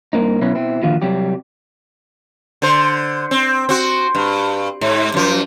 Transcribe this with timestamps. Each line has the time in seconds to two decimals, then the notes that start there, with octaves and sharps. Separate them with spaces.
0.13 G2 B2 A#3 C4 D#4
0.41 B2 F#3 C#4 E4 B4
0.55 B2 C4 E4
0.83 A#2 D3 D#3 F3 F#4 F5
1.02 C3 F#3 G3 G4
2.62 D3 C5
3.31 C4
3.69 C4 F#4
4.15 G2
4.81 G#2
5.14 F#2 F3